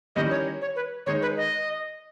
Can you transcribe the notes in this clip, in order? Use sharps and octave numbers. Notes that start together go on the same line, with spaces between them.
D#3 G3 C#4 E4 D#5
C#5
C#5
B4
D#3 G#3 D#4 C#5
B4
D#5